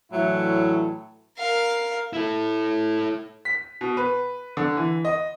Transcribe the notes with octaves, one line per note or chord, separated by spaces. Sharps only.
A2 E3 F#3 A3 D4 E4
A#4 F5
E4 A4
B6
B2
B4
D3
E3
D#5